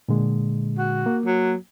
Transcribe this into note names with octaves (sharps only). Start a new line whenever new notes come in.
A#2 D3 G#3
F#4
A#3
F#3